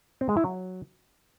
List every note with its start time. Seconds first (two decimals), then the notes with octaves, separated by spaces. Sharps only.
0.21 C4
0.29 G#3
0.37 E4
0.44 F#3